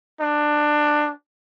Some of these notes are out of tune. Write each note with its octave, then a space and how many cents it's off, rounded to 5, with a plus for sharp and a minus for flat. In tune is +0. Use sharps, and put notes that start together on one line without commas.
D4 +15